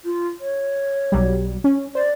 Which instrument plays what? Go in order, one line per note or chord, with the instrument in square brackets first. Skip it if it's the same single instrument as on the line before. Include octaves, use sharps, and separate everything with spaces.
[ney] F4
C#5
[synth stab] B1 F#3 G3
C#4
[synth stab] C5 [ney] D5